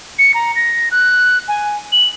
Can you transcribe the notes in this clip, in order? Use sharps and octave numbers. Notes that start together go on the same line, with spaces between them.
C#7
A#5
A#6
F#6
G#5
F#7